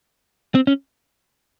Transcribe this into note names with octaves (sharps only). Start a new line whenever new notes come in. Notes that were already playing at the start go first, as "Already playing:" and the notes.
C4
C#4